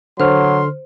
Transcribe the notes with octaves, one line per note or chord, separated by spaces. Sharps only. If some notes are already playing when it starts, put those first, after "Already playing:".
D3 F#3 C5 C6 F6